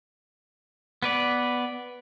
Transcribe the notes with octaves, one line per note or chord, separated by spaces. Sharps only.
B3 B4 D5